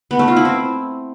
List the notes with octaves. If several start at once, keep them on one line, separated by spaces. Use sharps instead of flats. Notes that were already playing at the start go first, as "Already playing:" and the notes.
B3
A3
F4
E4
C4